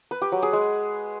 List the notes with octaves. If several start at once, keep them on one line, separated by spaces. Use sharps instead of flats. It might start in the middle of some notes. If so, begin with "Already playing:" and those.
B4
G4
F#3
G#4
G#3